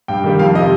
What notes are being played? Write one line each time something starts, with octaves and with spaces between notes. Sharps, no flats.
G2 G5
D#3 G3 A#3
F2 F5
C3 G3 D#5